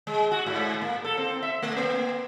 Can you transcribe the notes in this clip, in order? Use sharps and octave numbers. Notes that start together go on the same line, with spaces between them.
G#3
F#4
G#2
A#3
A4
C4
E5
A3
A#3